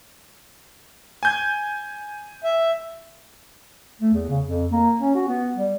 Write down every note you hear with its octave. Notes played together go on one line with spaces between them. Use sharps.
G#5 G6 G#6
E5
A3
E2
C#3
F2
A#3
C#4
F#4
B3
G3